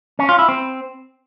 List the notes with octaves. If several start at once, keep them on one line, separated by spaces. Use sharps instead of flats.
C#4
F4
E4
C4